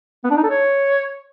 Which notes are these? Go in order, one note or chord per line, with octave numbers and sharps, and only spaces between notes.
B3
D4
D#4
A4
C#5